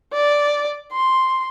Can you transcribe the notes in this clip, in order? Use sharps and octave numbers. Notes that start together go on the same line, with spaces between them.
D5
C6